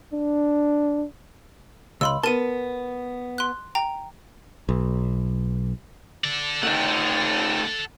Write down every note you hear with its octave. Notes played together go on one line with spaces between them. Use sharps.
D4
C#2 B5 C6 E6
B3 A#4 A5 D#7
C6 F#6
G5 A#5
B1
A4 D5
A3 D#4 A4 F#5